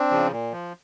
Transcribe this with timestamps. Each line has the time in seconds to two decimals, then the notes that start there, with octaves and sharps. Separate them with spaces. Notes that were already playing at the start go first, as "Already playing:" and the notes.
Already playing: C4 D4
0.11 C#3 F3
0.32 A#2
0.52 F3